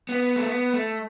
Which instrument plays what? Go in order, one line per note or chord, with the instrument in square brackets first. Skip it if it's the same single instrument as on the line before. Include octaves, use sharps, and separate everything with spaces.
[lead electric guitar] B3
A3
B3
A3